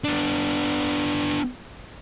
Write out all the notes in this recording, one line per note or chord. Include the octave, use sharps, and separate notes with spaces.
B3 D4